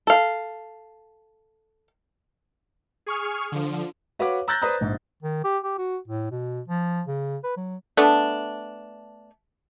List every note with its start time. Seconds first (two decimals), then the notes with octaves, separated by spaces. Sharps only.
0.07 A4 F5
3.06 G#4 C#6 F6
3.52 D3 F3
4.19 F#4 B4 C#5 F5 F#5 D6
4.48 A#5 E6 F#6 G6 A6 A#6
4.62 B4 C5 D5 A#5 D#6
4.81 A#1 G#2
5.22 D#3
5.44 G4
5.64 G4
5.78 F#4
6.08 A2
6.31 B2
6.68 F3
7.07 C#3
7.44 B4
7.57 F#3
7.97 A3 B3 D4